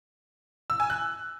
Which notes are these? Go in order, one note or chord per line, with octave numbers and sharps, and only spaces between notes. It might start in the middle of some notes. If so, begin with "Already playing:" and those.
E6
G#5
F#6